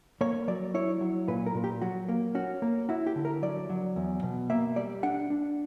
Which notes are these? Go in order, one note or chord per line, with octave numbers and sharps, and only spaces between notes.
A#3 C#5
F#3 D5
E4 C#5
F#3
A#2 B4
A#4
A#2
G4
F#3 F#4
A#3
C#4 F#4
A#3
E4 F#4
G4
D3
A#4
F#3 D5
F#3
E2
B2
A#3 E5
G3 D5
D4 F#5
D4